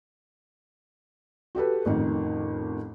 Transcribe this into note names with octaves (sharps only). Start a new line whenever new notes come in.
F#4 G4 A4 B4
A1 F2 D#3